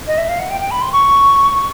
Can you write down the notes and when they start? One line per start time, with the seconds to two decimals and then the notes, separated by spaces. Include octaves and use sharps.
0.07 D#5
0.17 E5
0.29 F5
0.39 F#5
0.50 G5
0.60 G5
0.70 B5
0.81 C6
0.92 C#6